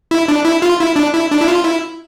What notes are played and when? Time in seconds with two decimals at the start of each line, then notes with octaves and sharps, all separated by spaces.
0.11 E4
0.28 D4
0.45 E4
0.62 F4
0.79 E4
0.96 D4
1.13 E4
1.31 D4
1.40 E4
1.48 F4
1.64 E4